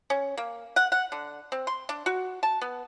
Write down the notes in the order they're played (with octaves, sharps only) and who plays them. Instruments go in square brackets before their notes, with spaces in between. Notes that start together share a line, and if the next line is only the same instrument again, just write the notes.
[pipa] C#4
A#3
F#5
F#5
D3
C4
C6
D4
F#4
A5
B3